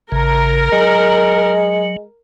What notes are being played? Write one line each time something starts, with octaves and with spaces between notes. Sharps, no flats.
A1 C#3 A#4
F#3 G#3